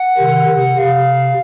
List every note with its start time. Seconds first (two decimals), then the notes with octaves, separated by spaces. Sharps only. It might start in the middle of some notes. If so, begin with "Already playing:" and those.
Already playing: F#5
0.18 C3 D#3
0.47 C3
0.77 C3 F5